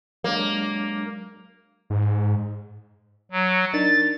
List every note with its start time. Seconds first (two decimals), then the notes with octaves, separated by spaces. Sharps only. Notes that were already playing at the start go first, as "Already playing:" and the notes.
0.24 F#3 G#3 A#3 D4
1.90 G#2
3.31 F#3
3.73 D4 D#4 A#4 A6